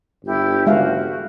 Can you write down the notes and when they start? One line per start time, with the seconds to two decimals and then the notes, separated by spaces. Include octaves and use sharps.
0.25 G1 E4 G4
0.67 G#3 F#4 E5 F5